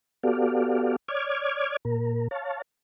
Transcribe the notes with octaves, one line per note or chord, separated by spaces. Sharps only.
B3 F#4 G4 A4 D5 F5
C#5 D5 D6 F6 G#6
A#2 A#4
C#5 F5 A5